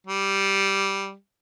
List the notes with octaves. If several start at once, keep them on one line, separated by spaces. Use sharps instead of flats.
G3